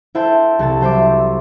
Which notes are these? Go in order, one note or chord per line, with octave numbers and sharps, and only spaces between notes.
E4 A4 C5 E5 G5 A5
C2 A4 A5
F#3 C5 E5 D6